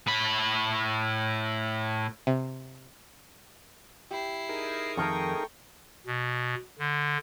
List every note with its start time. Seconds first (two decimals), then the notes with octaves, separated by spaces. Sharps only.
0.07 A2 B5
2.27 C3
4.11 E4 G4 C7
4.49 D#4 G#4 A#4
4.97 F2 D#3 A3 A4 G5 A#5 C#6
6.06 B2
6.79 D3